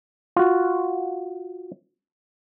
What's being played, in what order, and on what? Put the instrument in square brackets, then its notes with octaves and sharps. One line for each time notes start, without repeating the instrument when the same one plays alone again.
[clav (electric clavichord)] F4 F#4